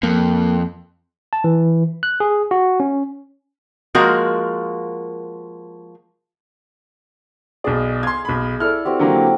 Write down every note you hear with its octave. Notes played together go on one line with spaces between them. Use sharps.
F2 A#3
A5
E3
F#6
G#4
F#4
C#4
F3 G#3 A#3 F#4 A#4
B1 G#4 D5 D#5 A#5
F5 G#5 C6 G#6
B1 B5
E4 A4 D5 F6
C4 F#4 G4
D3 F#3 A#3